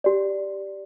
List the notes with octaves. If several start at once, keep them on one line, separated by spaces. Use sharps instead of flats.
G4 D5